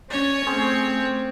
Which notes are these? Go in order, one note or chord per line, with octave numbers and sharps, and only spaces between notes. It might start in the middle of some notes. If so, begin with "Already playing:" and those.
C#4 C#5 D5
A3 C4 C#4 G#4 C5